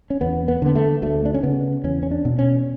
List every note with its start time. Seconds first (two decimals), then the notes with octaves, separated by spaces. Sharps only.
0.10 C#4
0.21 E2 B3
0.48 B3
0.62 D3 B3
0.75 A3
1.02 D2 A3
1.26 D4
1.34 C#4
1.43 C#3 B3
1.84 E2 C#4
2.03 C#4
2.11 D4
2.25 B2
2.39 C#4